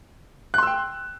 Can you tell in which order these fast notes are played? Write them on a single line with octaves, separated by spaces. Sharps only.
F#6 C6 E6 G5